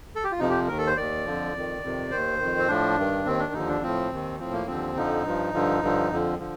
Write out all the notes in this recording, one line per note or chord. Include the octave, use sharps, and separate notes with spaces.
A4
G4
F4
F2 C3 F3 D#4
G4
D#2 D#3 A#4
A4
C5
D#2 D#3 D5
F2 D3 F3
F2 D#3
F2 C3 D#3
D#2 D#3 C5
F2 D#3
C4
A2 F3 D4
G2 D#3
D#2 D#3 C4
D4
D#2 D3 F3 D#4
D4
A2 F3 C4
D#2 D#3
A2 F3 C4
A#3
D#2 D3 F3 C4
F2 D3 F3 D#4
G2 F3
G2 D3 F3
G2 D3 F3
F2 D3 F3
D3 F3